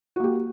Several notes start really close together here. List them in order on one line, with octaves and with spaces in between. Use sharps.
F#4 A#3 G4